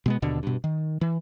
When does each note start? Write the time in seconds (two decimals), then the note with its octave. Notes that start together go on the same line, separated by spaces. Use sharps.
0.06 B2 G#3 B3
0.22 D#2 B2 D3 D4
0.43 G2 B2
0.64 D#3
1.01 E3